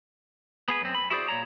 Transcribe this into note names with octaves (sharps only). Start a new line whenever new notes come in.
B3 G#4 B4
F#2 C4
B5
E4 F#4 G#4 C5 D5
A#2 C#5 A#5